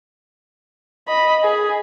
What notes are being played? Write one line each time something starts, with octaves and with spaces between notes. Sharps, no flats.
D#5 B5
G#4